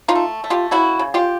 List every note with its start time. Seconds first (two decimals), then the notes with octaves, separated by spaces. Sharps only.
0.08 D#4 F4
0.15 A3
0.44 A3
0.50 F4 G4
0.71 C#3 E4 F#4
0.99 C#3
1.14 F4 G4